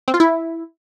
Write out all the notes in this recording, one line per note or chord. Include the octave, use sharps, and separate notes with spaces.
C4
F4
E4